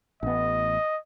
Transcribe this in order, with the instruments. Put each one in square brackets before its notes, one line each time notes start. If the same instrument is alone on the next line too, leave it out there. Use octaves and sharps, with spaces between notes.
[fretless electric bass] A1 B3 [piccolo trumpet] D#5